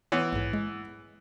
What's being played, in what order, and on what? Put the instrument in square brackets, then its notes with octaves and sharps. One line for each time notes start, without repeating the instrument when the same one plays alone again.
[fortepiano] E3 B3 [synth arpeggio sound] C#5
[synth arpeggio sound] A#1 G#2
G#3